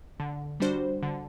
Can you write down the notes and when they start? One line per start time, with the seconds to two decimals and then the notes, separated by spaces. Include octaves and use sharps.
0.20 D3
0.60 G3 D4 F#4 C5
1.03 D3